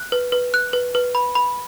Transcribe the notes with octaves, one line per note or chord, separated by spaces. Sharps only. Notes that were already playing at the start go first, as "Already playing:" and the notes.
Already playing: F#6
B4
B4
F#6
B4
B4
B5
B5